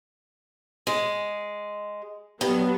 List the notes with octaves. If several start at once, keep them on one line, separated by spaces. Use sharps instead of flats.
G#3
G2 F#3 B3